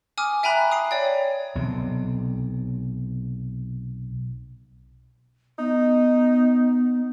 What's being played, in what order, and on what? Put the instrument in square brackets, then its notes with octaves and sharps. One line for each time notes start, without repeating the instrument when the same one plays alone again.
[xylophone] G#5 D6 D#6 F6
E5 G5 G#5 A#5 B5 F#6
D#6 C7
C#5 D5 G5
[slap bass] B1 C3
[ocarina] B3 [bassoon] D#4